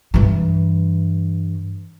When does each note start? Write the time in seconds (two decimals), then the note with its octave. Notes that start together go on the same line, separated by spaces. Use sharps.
0.14 G2 E3